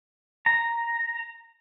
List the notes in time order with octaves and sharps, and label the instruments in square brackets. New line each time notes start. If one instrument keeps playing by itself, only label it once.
[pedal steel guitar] A#5